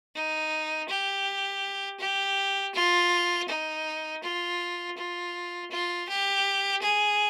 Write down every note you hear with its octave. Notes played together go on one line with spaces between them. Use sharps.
D#4
G4
G4
F4
D#4
F4
F4
F4
G4
G#4